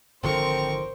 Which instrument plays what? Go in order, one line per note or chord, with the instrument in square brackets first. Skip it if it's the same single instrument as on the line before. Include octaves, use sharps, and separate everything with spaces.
[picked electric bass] G#1 D3 F3 [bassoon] C4 [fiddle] A#4 C#6 [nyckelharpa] C5